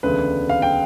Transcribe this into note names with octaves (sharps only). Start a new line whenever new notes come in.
E1 D2 C#3 B4
F5
G5